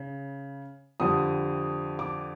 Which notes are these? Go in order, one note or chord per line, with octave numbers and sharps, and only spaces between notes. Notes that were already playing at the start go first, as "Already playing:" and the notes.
Already playing: C#3
F2 D3 G3 D#6
D6